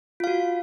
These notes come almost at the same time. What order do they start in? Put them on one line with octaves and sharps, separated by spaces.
F4 F5 F#4